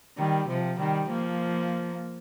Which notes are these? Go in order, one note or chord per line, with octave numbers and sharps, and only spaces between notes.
D#3 G3
C3 F3
D#3 G3
F3 A#3